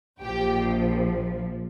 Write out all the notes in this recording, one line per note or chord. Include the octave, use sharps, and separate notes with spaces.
A#1 A#2 F3 G4 G5